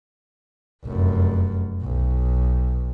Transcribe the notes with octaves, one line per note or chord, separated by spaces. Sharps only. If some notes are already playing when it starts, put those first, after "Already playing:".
F1 F#2
B1